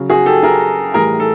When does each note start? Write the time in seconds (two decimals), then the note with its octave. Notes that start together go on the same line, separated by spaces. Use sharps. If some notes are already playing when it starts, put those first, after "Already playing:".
Already playing: C#3 F#3
0.10 F#4 G#4
0.26 G4 A4
0.43 G#4 A#4
0.94 A2 E3 G3 G#4 A#4
1.20 A4